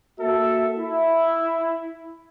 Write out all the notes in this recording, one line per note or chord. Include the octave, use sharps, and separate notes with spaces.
A#3 F#4 A4 E5
E4